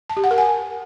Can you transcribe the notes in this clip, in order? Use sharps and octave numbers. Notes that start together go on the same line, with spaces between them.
A5
G4
F#5
A#4
G#5